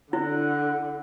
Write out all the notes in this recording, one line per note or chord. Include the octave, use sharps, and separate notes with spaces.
D3 E4 F#5